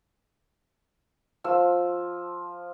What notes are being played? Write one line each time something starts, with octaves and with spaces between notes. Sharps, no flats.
F3 E6